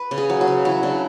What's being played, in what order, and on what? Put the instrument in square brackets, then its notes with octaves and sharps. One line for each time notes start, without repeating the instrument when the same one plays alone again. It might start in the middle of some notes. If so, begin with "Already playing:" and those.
Already playing: [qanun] B4
C#3
G#4
F#3
F#4
C#3
F#3 E4
C#3 D4